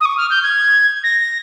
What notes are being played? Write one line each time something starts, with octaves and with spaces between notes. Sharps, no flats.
D#6
C#6
F6
G6
G#6
A#6